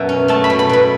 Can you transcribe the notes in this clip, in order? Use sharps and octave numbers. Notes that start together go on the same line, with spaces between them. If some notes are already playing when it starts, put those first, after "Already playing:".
Already playing: F#2 B2 E5
C#4
A3 A5
B5
B2
B5
B2 B5